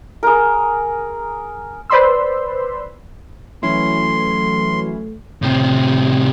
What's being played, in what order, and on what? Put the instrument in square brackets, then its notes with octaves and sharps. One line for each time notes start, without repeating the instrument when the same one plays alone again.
[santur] G#4 A#4
[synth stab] B4 C5 D5 B5 C6 E6
[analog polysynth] E3 F#3 [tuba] A3 [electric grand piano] C#4 E4 [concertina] C6
[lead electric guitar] A2 C3